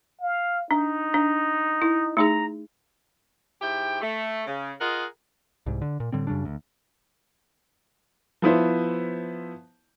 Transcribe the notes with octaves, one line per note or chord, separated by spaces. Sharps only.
F5
D4 D#4
D4
E4
A3 D#4 G#4 A#5
G#2 E4 G4 G5
A3
C#3
F4 G#4 A#4 D#5 F#5
C2 G#2
D3
A#2
A2 D3 G3 C4
F#2 C#3 G3 D4
D2
F3 B3 E4 C5